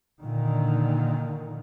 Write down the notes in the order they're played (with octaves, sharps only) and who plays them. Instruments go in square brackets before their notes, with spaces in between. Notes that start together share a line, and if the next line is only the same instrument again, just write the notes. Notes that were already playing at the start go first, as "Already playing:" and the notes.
[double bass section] A#2 D3 D#3